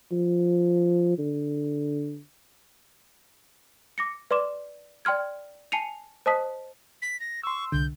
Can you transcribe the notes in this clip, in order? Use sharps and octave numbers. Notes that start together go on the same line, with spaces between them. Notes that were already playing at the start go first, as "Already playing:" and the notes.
F3
D3
D6 A#6 C#7
B4 D5 C6 D6 E7
D5 G5 C6 F6 G#6
G#5 A5 C7 C#7 D#7 F7
C5 D#5 A5 D#6 B6
B6
A#6
C6 C#6 E6
C2 D3 G6